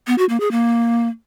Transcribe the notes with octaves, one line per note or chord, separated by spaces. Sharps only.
B3
F#4
A#3
G#4
A#3